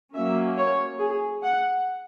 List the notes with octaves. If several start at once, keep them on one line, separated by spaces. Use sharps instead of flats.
F#3 A#3 C#4 E5
C#5
G#4
F#5